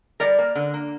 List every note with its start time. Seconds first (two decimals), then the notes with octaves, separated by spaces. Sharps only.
0.20 G3 A#4 D5
0.39 A#3
0.55 D3
0.74 A#3